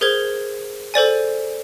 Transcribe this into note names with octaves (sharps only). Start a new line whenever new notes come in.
G#4 A#4 C5 G#6
A4 C5 D5 G#5